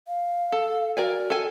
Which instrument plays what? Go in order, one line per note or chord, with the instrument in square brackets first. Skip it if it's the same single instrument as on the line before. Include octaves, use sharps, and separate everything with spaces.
[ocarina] F5
[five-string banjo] A4
[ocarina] F#4 [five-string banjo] A#4 D5 G#5
[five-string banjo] A4 G#5